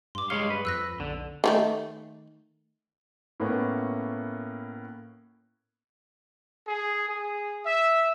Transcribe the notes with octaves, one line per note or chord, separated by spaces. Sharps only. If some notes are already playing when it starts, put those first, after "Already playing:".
G2 C6 D6
G#3 C#5 F5 G7
B4
F2 E6 F#6 A#6
B1 D3
D#3 F3 A3
A2 A#3 B3 C#4
G#4
G#4
E5